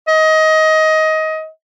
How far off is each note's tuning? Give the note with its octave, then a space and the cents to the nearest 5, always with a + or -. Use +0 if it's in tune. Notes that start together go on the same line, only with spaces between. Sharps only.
D#5 +20